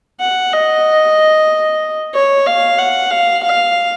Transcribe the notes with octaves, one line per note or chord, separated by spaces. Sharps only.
F#5
D#5
C#5
F5
F#5
F5
F5